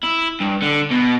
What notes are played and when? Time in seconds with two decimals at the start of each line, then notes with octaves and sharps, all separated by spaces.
0.03 E4
0.40 G2
0.62 D3
0.91 B2